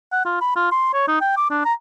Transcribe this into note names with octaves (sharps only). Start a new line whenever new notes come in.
F#5
F4
B5
F4
C6
C#5
D#4
G5
D6
D4
A#5